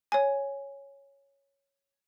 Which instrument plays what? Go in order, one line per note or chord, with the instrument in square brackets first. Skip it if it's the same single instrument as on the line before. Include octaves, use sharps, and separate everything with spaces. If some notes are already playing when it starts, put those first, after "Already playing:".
[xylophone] C#5 G#5